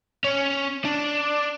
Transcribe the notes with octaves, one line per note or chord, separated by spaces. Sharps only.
C#4
D4